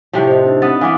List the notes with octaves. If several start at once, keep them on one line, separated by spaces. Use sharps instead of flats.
A2 C3 F3
C5 D#5
D4 D#4
B3 C4 D#6 A6
E3 B3 F5 D6